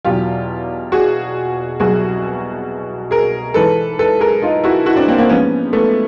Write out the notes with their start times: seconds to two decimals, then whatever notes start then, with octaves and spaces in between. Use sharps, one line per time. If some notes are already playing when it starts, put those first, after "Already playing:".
0.05 E2 B2 F#3 F4 G4
0.92 F#4 G#4
1.80 C2 B2 F#3 F#4 G#4
3.11 G#4 A#4
3.54 G#2 E3 A4 B4
3.99 A4 B4
4.20 G#4 A#4
4.42 D#4 F4
4.64 E4 F#4
4.86 E4 F#4
4.96 C4 D4
5.08 A#3 C4
5.18 A#3 C4
5.29 G#2 F3 B3 C#4
5.73 A3 B3